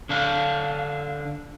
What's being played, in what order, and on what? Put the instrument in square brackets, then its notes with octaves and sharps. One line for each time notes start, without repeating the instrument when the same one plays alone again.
[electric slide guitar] D3 D4 F5